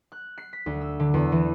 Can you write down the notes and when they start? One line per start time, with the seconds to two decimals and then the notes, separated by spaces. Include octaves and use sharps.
0.12 F#6
0.38 C7
0.53 B6
0.66 D2
0.81 E6
1.00 D3
1.14 E2
1.32 E3